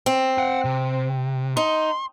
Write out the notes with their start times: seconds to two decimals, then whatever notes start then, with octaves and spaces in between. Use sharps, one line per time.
0.06 C4
0.38 F#5 G5
0.65 C3
1.57 D#4 C6